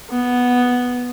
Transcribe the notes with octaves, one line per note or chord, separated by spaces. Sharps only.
B3